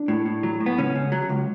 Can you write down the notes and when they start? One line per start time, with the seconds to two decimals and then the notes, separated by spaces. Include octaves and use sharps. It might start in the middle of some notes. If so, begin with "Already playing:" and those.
Already playing: D4
0.08 A2
0.26 A2
0.43 F#3
0.60 A2
0.66 B3
0.77 C#2 C#4
0.95 C#3
1.12 F#3
1.29 C#2